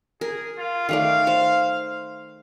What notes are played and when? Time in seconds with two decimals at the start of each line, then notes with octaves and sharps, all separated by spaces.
0.21 G#4 A#4
0.58 F4
0.89 D#3 A3 D5 F5
1.27 C5